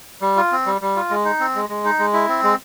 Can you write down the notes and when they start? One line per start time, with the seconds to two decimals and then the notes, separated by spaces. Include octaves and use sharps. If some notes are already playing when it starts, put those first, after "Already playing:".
0.21 G3
0.36 F4
0.52 C4
0.66 G3
0.81 G3
0.96 F4
1.10 G#3
1.25 D#4
1.40 C4
1.55 G#3
1.70 G#3
1.85 D#4
1.99 G#3
2.13 E4
2.28 C4
2.43 G#3